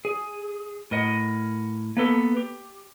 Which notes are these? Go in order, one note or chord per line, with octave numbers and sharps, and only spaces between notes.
G#4
A2 A#4 D#5 F#5
A#3 B3 A4
G4